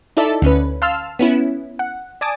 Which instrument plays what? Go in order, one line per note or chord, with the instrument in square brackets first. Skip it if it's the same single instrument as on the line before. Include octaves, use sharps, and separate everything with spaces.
[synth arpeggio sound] D#4 E4 A4 D5 E5 A5
D2 C#4 B4
F5 A5 C6 E6 F6
B3 C#4 E4
F#5
D5 G#5 A5 D6 D#6